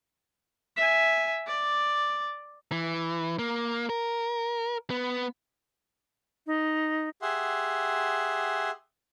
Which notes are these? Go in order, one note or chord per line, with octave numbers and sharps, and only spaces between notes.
E5 G#5
D5
E3
A#3
A#4
B3
D#4
G4 G#4 E5 F#5 C6